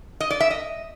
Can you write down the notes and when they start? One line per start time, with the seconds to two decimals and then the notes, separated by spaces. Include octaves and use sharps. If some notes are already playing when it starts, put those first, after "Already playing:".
0.20 D#5
0.30 D5
0.40 E5
0.50 D#5